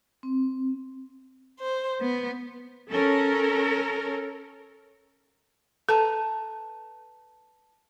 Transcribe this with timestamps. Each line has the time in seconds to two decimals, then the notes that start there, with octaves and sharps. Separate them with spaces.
0.23 C4
1.60 C5
2.01 B3
2.91 C#4 A4 A#4
5.89 A4 B4 A5 A#5